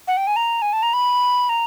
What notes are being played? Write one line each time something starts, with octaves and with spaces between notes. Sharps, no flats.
F#5
G5
G#5
A#5
G#5
A5
A#5
B5
A#5